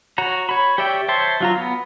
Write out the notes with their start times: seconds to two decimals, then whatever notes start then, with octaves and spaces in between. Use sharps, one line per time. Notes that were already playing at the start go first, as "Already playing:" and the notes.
0.18 F#4 C#5 A#5
0.49 C#5 B5
0.78 G4 C#5 D5 E5 G5
1.08 C5 C#5 E5 A5 C6
1.40 F#3 F4 A#5
1.56 B3